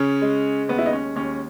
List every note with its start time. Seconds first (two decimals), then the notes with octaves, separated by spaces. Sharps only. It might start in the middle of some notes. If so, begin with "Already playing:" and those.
Already playing: C#3 C#4
0.22 G#3
0.69 D#2 B3
0.78 E4
0.86 D#4
0.93 C#4
1.16 D#2 C#4